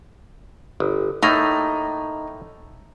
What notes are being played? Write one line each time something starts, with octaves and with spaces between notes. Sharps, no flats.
G1
A2 A3 A#3 D#4